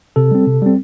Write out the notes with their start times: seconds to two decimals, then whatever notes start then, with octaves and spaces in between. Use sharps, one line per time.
0.16 C3 A4
0.31 G3 C4
0.47 C3
0.62 G3 C4